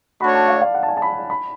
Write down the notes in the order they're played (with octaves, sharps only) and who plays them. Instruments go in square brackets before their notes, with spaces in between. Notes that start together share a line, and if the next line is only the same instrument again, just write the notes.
[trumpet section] A3 D4 F#4 C#5 [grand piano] B5
[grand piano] A5
F5
D5
F5
F#5
A5
G#5
A5
B5
B5